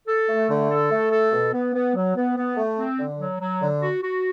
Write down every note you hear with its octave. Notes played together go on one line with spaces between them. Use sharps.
A4
A3
D3
A4
A3
A4
B2
B3
B3
F#3
B3
B3
A3
C4
D3
F#3
F#3
D3
F#4
F#4